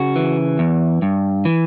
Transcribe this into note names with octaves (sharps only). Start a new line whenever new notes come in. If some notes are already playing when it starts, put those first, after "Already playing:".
Already playing: C#3 F#4
E3
E2
G2
E3